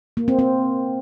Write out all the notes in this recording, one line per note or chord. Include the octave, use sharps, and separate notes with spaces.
A#3
C4
C4